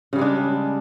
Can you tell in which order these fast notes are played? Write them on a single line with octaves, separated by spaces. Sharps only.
C#3 G3 G#3 D4